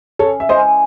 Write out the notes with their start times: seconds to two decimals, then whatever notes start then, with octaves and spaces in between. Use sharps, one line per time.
0.19 C#3 A4 C#5
0.40 E5
0.49 E3 G#3 C#4 C5 D#5